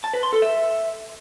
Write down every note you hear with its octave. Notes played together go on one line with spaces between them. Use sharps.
A5
B4
C6
A4
E5